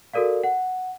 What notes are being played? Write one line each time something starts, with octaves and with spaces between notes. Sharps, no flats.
F#4 A4 A#4 D5 F5
F#5